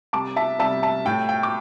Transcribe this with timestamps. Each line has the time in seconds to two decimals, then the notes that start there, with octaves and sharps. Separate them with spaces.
0.13 C2 A5 D6
0.36 E5 A5
0.59 C3 G3 E5 A5
0.83 E5 A5
1.05 A2 G5
1.29 G5
1.43 D6